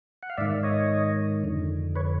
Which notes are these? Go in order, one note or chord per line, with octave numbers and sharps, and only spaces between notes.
F#5
F5
G#2 D#3 D5 E5
C#5 D#5
F2 D3
B4 C#5